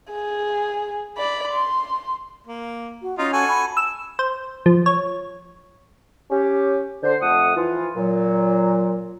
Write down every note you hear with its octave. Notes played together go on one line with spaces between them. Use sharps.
G#4
D5 B5
C6
A#3
F#4
C#4 D#4 F4
F#4 A4 G#5
B5
E6
C5
F3
C#5
C#4 G4
D3 C5
F2 A3 F#5 D#6
E3 F3 F4
A#2 F#3